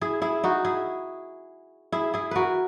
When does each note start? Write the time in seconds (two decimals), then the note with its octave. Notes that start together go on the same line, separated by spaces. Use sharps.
0.01 E4 G#4
0.22 E4 G#4
0.44 D#4 F#4
0.65 E4 G#4
1.92 E4 G#4
2.14 E4 G#4
2.31 F#4 A#4 B4